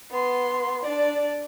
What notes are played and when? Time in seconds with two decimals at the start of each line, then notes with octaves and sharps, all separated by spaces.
0.11 B3 C6
0.83 D4 D5